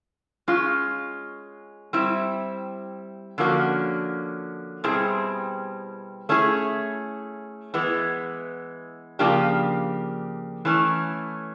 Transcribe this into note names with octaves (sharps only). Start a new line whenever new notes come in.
G#3 C#4 F4
G3 C4 E4
D3 F3 A#3 C#4 F#4
B2 G3 C4 E4 G#4
A3 C#4 E4 G#4
E3 G#3 B3
C#3 F3 A#3 D4 G4
E3 A3 C#4